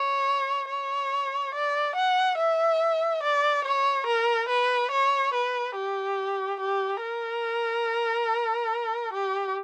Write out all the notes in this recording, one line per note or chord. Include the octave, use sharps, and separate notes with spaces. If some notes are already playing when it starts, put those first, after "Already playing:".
Already playing: C#5
C#5
D5
F#5
E5
D5
C#5
A#4
B4
C#5
B4
G4
G4
A#4
G4